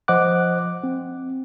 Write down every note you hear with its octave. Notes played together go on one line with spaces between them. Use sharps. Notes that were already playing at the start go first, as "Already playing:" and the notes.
F3 C5 D#5 F#5 D6 F#6
C4